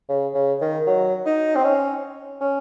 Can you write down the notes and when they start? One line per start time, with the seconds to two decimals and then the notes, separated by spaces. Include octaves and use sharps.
0.09 C#3
0.35 C#3
0.61 D#3
0.87 F#3
1.26 D#4
1.56 C4
1.64 C#4
2.41 C#4